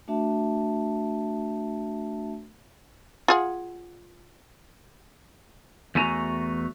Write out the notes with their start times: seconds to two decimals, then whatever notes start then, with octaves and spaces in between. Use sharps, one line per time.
0.08 A3 D4 F#4 E5 A5
3.28 F4 G#4 F#5
5.95 E2 A3 F#4 G#5 A#5